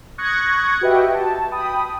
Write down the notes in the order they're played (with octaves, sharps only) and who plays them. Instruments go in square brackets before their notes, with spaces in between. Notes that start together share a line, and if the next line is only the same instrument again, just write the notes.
[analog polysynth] C#6 D#6 F#6 G#6 A#6 C#7
F#4 G4 B4 D#5 E5 G5
A5
G5 B5 D#6